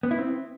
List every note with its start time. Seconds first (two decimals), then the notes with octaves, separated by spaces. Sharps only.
0.03 B3
0.11 E4
0.18 C4